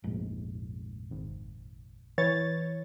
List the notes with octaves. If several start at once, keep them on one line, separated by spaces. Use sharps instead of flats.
F1 A#1 G#2
G#1
E3 C#5 A6